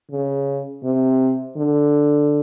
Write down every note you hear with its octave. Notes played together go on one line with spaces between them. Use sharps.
C#3
C3
D3